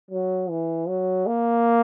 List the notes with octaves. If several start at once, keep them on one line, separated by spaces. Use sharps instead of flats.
F#3
E3
F#3
A#3